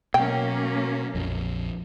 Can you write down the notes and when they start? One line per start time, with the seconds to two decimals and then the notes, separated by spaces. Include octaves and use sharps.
0.14 B2 F#3 A#3 C#4 G5
1.15 A#1 F2